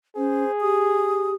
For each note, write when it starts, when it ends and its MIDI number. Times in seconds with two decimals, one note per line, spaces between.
0.16 0.44 61
0.16 1.34 68
0.16 0.51 72
0.61 1.34 67
0.61 1.33 87